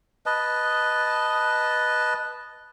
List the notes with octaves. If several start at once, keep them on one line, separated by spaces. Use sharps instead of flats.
B4 D#5 A5